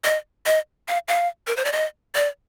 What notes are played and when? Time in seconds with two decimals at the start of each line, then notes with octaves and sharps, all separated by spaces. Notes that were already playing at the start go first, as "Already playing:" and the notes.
0.04 D#5
0.46 D#5
0.88 F5
1.08 F5
1.47 A#4
1.56 C5
1.65 D5
1.72 D#5
2.15 D5